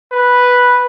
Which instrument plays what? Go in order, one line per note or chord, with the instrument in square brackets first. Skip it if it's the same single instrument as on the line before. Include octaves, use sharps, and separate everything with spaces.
[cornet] B4